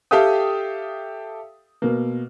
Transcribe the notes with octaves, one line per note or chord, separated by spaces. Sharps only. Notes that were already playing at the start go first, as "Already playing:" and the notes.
G4 A4 E5 F5 G5 D#6
B2 A#3